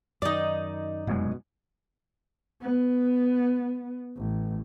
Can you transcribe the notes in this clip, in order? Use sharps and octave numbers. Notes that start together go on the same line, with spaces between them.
F#2 D#3 D#4 D5
F1 F#2 B2 G#3
B3
A1